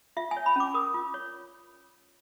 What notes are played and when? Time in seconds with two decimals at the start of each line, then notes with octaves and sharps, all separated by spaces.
0.17 F4 E5
0.31 G#5
0.37 C#5
0.46 B5
0.56 C#4 D6
0.74 A#4 D#6
0.94 F4
1.14 C#5